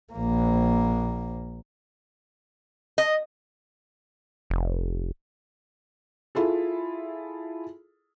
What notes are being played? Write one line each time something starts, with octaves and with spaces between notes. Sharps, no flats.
A#1 A#3
D#5
F1
E4 F4 G#4 A4